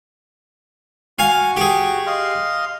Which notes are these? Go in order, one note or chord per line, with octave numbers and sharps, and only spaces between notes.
F#4 F5 G#5 C#6
G4 G#4
D#5 F5 C6